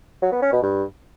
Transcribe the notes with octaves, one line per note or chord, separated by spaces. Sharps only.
F#3
B3
C#4
B2
G2